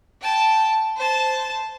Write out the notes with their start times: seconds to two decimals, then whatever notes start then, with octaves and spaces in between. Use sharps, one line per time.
0.21 G5 A5
0.97 C5 A5